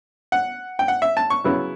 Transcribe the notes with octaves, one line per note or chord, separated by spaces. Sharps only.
F#5
G5
F#5
E5
A5
C#6
C#3 F#3 B3 E4